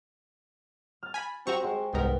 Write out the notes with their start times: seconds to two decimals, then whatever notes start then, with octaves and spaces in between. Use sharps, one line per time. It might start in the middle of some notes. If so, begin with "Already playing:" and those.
1.03 F6 A6
1.14 G#5 B5
1.47 C4 F#4 G4 A#5 C#6
1.64 G#3 C5
1.94 C2 G#2 B3 A#4